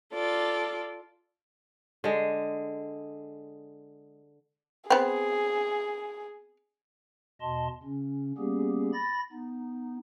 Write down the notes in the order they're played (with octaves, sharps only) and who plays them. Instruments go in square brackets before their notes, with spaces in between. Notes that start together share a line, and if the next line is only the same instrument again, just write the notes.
[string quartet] F4 A4 D5
[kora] D3 G#3
[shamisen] B3 C4 [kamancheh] G#4
[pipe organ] E2 B2 D#5 A5 C6
C#3 C#4
G3 A#3 B3 C#4 G4 G#4
B5 A6 A#6
B3 D#4